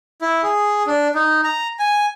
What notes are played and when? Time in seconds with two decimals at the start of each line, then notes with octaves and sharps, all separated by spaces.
0.21 E4
0.43 G#4
0.87 D4
1.15 D#4
1.44 A#5
1.79 G#5